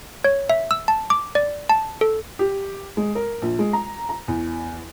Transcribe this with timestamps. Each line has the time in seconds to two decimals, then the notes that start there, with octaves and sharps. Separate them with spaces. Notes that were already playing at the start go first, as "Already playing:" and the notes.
0.24 C#5
0.50 E5
0.71 E6
0.88 A5
1.10 D6
1.35 D5
1.69 A5
2.01 A4
2.39 G4
2.97 G#3
3.15 A#4
3.42 A#1
3.59 G#3
3.73 A#5
4.09 A#5
4.28 E2